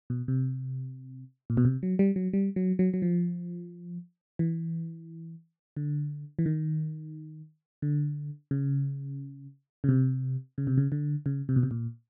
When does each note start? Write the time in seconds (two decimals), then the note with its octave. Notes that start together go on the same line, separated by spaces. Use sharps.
0.10 B2
0.28 C3
1.50 A#2
1.57 B2
1.65 C3
1.83 F#3
1.99 G3
2.16 F#3
2.33 G3
2.56 F#3
2.79 F#3
2.94 F#3
3.02 F3
4.39 E3
5.77 D3
6.39 E3
6.46 D#3
7.82 D3
8.51 C#3
9.84 C#3
9.89 C3
10.58 C#3
10.67 C3
10.78 C#3
10.92 D3
11.26 C#3
11.49 C3
11.56 B2
11.63 C3
11.71 A#2